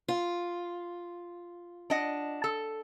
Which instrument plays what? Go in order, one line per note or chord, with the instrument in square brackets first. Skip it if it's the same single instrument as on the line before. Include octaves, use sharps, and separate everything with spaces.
[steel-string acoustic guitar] F4
[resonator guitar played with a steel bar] D4 D#5 F#5
A4